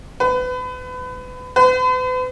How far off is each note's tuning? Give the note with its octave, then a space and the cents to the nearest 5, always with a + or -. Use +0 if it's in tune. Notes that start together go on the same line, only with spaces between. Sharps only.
B4 +30
B4 +45